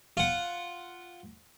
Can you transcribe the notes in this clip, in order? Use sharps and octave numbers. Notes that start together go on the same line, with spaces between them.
F4 F#5